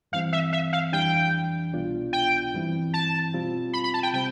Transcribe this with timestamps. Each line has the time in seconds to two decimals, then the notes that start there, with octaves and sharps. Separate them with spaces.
0.12 G2 E3 G3 C4 F5
0.33 E5
0.53 E5
0.73 F5
0.92 F2 E3 G3 D4 G5
1.72 C2 B2 B3 D4 F4
2.13 G5
2.54 G2 E3 G3 C4 E4
2.94 A5
3.33 B2 G3 C4 F4
3.73 B5
3.84 B5
3.94 A5
4.03 G5
4.13 C3 G3 C4 G5